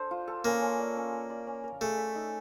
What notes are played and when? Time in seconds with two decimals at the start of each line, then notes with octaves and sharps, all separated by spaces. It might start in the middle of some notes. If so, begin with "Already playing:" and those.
Already playing: D4 A4 C5
0.11 F4
0.27 A4
0.45 A#3 C#4
0.62 C#4
0.79 D5
0.96 C#4
1.13 A#4
1.30 D5
1.47 C#4
1.64 A#4
1.81 A3 G#4
1.98 E5
2.16 D#4